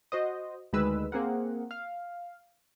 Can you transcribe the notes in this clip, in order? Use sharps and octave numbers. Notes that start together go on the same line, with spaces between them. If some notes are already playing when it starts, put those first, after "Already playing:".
F#4 C5 D#5
D2 D#3 G#3 B4 E6
A#3 C4 G#4 A#4 F#5
F5